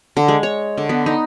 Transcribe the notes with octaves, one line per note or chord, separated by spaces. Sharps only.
D3
G#3
C#5
D3
B3
D#4